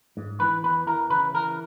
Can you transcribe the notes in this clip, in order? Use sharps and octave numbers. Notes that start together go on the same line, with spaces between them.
G#2
E3 B4
E2 B4
E3 A#4
C#3 B4
E3 A#4